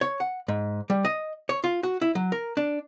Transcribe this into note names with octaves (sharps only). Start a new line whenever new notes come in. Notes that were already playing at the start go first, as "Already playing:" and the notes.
C#5
F#5
G#2
G3
D#5
C#5
F4
F#4
E4
F#3
A#4
D4